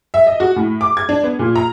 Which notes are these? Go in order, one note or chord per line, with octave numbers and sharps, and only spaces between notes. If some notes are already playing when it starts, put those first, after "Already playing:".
E5
D#5
F#4
A2
D6
G#6
D4
B3
A#2
A#5